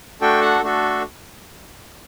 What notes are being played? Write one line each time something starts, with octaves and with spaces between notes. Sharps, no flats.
A3 D4 F#4 A4 G5
F#5
A3 D4 F#4 A4